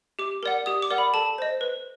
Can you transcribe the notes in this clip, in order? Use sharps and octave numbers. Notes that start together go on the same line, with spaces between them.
G4 D6
A#4 D5 F#5
G4 D#6
D6
A#4 D5 F#5
B5
A4 A5
C5 D#5
B4